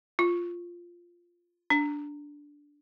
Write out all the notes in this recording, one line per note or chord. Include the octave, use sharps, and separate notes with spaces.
F4
D4